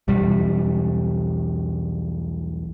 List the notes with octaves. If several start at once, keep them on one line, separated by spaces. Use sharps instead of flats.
B1 E2 G3